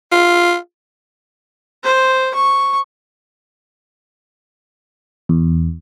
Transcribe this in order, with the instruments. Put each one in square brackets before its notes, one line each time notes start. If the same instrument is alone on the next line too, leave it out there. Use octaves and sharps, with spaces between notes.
[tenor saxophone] F4
[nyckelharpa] C5
C#6
[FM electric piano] E2